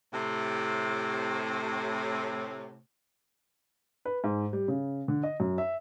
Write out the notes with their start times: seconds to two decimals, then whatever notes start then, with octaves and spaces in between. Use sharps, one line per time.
0.13 A2 C3
4.05 B4
4.24 G#2
4.53 G3
4.68 C#3
5.08 D3
5.23 D#5
5.40 F#2
5.58 E5